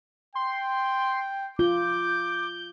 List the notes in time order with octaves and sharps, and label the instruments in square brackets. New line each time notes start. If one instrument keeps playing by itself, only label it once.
[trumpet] G5 [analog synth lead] C6
[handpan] F4 [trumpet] D6 [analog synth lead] G6